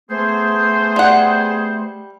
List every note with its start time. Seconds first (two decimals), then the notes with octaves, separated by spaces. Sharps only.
0.10 A3 B3 G#4 C5
0.96 G3 F#5